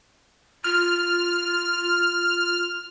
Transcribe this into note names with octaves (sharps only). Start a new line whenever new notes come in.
F4 F6